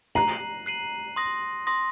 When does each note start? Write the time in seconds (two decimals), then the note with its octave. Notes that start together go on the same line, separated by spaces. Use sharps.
0.15 A#5 F#6 C7 D#7 F#7
0.66 F#6 C7 D#7 F#7
1.16 C6 D#6 A#6
1.67 C6 D#6 A#6